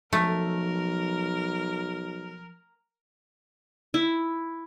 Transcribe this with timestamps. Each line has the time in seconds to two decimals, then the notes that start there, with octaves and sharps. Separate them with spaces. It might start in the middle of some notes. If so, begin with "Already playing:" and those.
0.13 B1 F3 A3 A#4
3.94 E4